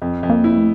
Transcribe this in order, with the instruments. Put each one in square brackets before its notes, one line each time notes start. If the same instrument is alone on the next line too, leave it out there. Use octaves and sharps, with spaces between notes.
[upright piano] F2
F2
[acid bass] A#3
[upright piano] E4
[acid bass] A3